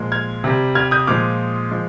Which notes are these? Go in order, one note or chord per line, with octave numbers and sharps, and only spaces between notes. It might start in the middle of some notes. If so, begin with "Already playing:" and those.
Already playing: A#2 F3 G#3
F6 G#6
C3 G3
F6 G#6
D#6 G6
A#2 F3 G#3 D6 F6
F3 G#3